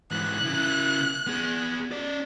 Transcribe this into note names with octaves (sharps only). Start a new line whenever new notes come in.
G#2 E3 F#6
C#3 E4
B3 G#4
C#4 D5